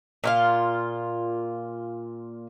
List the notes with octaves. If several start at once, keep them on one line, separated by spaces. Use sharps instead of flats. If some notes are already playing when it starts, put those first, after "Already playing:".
A#2 F4 F5